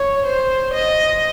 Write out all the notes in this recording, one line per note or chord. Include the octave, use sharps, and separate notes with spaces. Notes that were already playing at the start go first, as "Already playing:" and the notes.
Already playing: C#5
C5
D#5